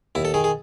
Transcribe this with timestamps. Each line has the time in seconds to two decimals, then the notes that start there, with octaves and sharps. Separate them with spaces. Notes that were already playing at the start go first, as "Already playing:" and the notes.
0.15 D#2 E4
0.25 A4
0.34 D#3 G#4
0.44 G#4